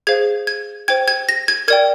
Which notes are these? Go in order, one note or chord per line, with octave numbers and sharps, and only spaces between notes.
G#4 C5 F5 G#6
G#6
C5 G5 G#6
G#6
A#6
G#6
A#4 D5 G5 G#6